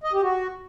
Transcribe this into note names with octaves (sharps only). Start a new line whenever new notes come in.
D#5
G4
F#4